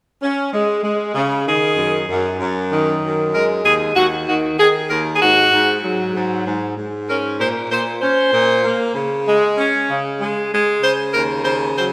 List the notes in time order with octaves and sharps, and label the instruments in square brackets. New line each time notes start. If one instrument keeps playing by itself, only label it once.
[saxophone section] C#4
G#3
G#3
C#3
D#3 G#4
F#2
F#2
F#2
D#3
F#2
G#3 A#4
D#2 G#4
D#2 F#4
D#3 F#4
D#3 G#4
D#2 A#4
G#4
G#2 F#4
G#2
F#3
G#2
G#2
G#2
C#4 A#4
A#2 C5
A#2 C5
C#4 C5
A#2
A#3
C#3
G#3
C#4
C#3
G#3
G#3
C#3 C5
D#2 A#4
C#3 C5
F#3 C5